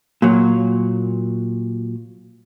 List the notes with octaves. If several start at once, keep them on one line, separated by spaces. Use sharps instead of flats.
A#2 F#3